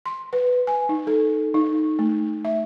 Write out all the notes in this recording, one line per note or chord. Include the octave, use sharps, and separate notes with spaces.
C6
B4
G#5
D#4
A4
D#4
A3
E5